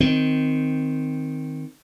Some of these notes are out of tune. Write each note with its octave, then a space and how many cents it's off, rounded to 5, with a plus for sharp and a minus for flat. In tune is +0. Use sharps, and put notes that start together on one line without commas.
D#3 +0 C4 -10